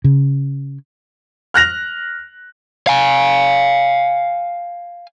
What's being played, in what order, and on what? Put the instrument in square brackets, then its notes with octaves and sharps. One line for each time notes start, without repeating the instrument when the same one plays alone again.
[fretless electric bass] C#3
[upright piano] F6 F#6 A#6 F7
[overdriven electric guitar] F5 G#5